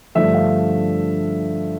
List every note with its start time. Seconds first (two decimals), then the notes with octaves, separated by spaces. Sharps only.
0.15 G2 D3 F3 A3 E5
0.34 F5